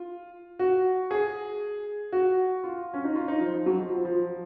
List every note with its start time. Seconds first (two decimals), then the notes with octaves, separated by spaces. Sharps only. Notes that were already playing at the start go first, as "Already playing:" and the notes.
Already playing: F4
0.59 F#4
1.11 G#4
2.12 F#4
2.64 F4
2.94 C#4
3.04 D#4
3.16 F4
3.28 D#4
3.41 F3
3.54 F3
3.66 F#3
3.79 F3
3.92 F3
4.05 F3